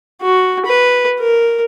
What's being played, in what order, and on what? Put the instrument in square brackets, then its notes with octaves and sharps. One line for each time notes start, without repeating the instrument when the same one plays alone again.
[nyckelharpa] F#4
B4
A#4